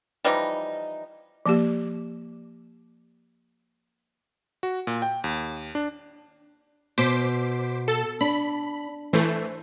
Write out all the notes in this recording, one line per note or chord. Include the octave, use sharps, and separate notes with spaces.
E3 F3 G3 D#4
F3 A#3 G4
F#4
A#2
G5
D#2
D4
B2 C5 D6 B6
A4
D4 B5
E3 A3 C5